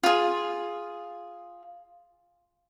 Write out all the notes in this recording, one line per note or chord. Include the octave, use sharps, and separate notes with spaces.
F4 G#4